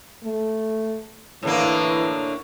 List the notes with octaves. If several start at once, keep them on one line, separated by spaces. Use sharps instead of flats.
A3
A2 D3 E3 A#3